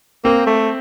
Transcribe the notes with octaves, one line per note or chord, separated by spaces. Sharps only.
A#3 C4 C5
A3